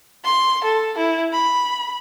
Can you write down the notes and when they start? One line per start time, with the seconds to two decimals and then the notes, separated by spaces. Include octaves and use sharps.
0.24 C6
0.64 A4
0.98 E4
1.33 B5